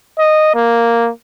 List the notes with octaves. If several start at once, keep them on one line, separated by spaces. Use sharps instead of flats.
D#5
A#3